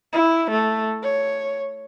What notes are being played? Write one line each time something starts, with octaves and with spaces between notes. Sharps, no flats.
E4
A3
C#5